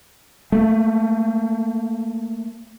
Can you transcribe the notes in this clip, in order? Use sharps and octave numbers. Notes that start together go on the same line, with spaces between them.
A3 A#3